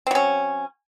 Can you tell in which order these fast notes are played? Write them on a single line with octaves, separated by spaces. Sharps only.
C4 F#3 C#4